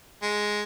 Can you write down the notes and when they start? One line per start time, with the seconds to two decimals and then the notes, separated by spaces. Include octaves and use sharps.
0.22 G#3